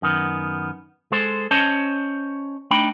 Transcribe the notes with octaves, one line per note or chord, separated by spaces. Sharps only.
F#2 D#3 B3
G#3 A4 C5
C#4 C5 C#5 D#5 A5
A3 D4 D#4 G5 B5